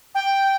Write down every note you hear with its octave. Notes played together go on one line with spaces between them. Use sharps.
G5